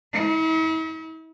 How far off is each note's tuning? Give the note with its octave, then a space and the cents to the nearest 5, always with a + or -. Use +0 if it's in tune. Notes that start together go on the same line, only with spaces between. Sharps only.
E4 -45